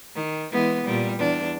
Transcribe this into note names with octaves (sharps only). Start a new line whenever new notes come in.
D#3
E3 G#3 B3
A#2 G3
E2 D4